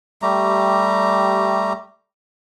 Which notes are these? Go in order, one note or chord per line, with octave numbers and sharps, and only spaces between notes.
G3 A3 G4 A#5